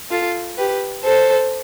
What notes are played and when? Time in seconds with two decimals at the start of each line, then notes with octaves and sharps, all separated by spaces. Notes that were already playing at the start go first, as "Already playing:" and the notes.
0.11 F4 A4
0.58 G4 B4
1.04 A4 C5